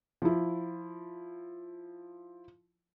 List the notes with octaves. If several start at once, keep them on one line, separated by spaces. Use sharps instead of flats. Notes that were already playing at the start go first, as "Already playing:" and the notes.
F3 E4